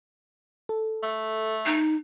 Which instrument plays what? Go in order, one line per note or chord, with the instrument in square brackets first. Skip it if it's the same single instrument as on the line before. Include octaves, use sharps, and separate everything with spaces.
[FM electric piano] A4
[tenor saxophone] A3
[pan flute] D#4